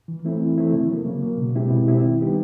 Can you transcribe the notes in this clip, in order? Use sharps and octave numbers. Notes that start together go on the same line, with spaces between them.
E3
A3 C4 E4
E3
A3 C4 E4
C#3
F#3 A#3
C#3
F#3 A#3
B2
G#3 C4 E4 G4
B2
G#3 C4 E4 G4
D#3
G3 B3 D#4 G4